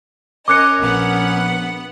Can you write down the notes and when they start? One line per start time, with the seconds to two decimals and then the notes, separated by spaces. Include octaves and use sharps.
0.48 C#4 A#4 D#5 D6 F#6 C#7
0.80 A#1 B3 F#5